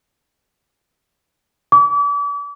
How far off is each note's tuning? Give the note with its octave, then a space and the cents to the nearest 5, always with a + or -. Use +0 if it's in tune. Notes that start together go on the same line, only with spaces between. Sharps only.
D6 -40